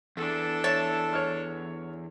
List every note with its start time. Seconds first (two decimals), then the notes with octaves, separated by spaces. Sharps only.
0.17 E2 D4 A4
0.64 C#5 E5 A5
1.13 C#5 F6